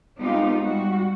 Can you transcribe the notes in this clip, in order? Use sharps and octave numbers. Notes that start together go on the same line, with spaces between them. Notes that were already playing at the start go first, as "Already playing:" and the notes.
G#3 B3 C4 D#4 F4 G4
G3 F#4